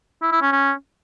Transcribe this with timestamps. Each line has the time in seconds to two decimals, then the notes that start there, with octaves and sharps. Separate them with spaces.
0.22 E4
0.32 E4
0.42 C#4
0.52 C#4